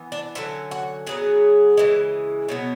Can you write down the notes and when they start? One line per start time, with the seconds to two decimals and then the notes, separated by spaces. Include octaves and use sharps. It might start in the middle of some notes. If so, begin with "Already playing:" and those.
Already playing: E3 B3
0.12 D4
0.35 D3 F#3 C#4 E4
0.71 F#4
1.07 C#3 F#3 B3 G#4
1.77 C#3 E3 G#3
2.48 B2 F#3 B3